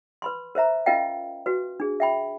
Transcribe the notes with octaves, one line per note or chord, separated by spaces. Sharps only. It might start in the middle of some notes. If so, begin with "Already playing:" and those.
B4 B5 C6
A#4 C5 E5 A#5
C#4 F4 A#4 D#5 F5 G5
F#4 B4
D4 G#4
E5 G5 B5